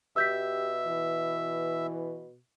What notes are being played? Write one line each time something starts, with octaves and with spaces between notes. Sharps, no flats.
B2 G4 E5 E6 G6 B6
E3